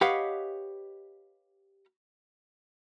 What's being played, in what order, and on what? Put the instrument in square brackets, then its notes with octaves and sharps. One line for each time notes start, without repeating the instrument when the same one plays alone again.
[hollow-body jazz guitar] G4 B4 C#5 D#5 F5 F#5